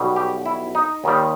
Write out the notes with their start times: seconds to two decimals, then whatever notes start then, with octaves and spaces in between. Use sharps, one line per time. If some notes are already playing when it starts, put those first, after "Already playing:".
Already playing: B1 B2 G3
0.16 G4
0.46 E4
0.75 D#4
1.04 D#2 D#3 G3